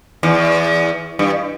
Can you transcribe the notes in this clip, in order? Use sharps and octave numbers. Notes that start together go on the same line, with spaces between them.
E2
G2